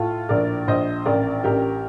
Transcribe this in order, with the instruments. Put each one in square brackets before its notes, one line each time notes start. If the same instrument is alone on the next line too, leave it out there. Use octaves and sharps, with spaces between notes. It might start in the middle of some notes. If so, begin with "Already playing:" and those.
Already playing: [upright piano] A2 A3 F4 A4
A#1 A#4 D5
A#1 C5 D#5
A1 A#4 D5
A1 G4 A#4